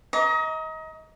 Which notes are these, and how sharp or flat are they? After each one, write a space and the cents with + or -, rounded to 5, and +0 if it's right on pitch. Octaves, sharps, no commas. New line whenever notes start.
D#5 +30 A#5 +10 D6 -35